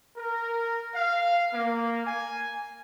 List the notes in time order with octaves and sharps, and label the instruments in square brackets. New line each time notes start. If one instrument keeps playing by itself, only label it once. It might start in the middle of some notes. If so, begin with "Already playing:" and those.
[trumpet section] A#4
F5
A#3
G#5